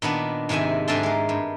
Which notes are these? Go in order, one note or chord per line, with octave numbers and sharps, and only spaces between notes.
A#2 D#3 B3 D4
G#2 C3 D#3 E5 G#5
G#2 D3 D5 E5 A5 C6
G#3 A#4
G2